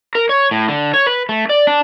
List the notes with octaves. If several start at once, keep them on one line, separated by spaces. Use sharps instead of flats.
A#4
C#5
A2
D3
C#5
B4
A3
D5
D4